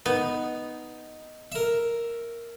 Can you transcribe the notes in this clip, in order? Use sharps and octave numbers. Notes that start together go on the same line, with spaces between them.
B3 D#4
A#4 E5